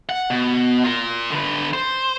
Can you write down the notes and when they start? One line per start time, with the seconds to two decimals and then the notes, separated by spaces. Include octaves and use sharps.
0.09 F#5
0.30 B2
0.84 F4 A#4
1.31 D3 B4
1.73 C5